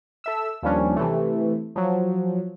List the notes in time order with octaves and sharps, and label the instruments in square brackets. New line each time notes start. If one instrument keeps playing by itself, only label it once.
[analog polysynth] A4 E5 E6
D#2 F3 G3 C#4 D4
C3 E3 A3
F3 F#3